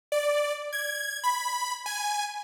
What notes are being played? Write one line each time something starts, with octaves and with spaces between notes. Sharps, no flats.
D5
G#6
B5
G#5